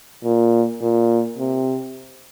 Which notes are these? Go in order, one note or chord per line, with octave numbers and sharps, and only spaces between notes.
A#2
A#2
C3